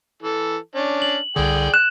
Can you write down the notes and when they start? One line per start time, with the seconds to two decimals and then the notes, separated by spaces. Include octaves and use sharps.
0.23 E3 A4
0.75 C#4 D4
1.02 F#7
1.36 C2 D3 G#4 D5 G5
1.74 F#6 E7